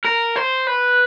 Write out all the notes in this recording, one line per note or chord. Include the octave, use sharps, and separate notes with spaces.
A#4
C5
B4